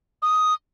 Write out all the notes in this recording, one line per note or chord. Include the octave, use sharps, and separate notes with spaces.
D#6